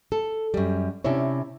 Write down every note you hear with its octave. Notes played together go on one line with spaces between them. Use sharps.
A4
F#2 G3
C3 C#4 D4 E4 C#5